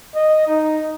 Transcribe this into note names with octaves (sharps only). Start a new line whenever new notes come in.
D#5
D#4